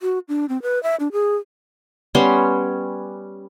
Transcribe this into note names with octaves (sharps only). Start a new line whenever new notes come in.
F#4
D4
C4
B4
E5
D4
G#4
G3 B3 C#4 C6